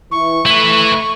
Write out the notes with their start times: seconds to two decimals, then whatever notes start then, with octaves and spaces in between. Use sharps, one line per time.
0.11 E3 C#6
0.46 A3 E4 B4